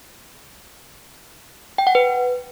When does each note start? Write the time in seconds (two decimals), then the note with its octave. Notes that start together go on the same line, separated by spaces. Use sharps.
1.78 G5
1.87 F#5
1.95 B4